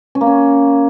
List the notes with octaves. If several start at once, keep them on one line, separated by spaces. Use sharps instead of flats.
C#4
A#3
C#4